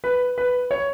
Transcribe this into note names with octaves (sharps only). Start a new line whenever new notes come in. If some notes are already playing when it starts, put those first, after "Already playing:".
B4
B4
C#5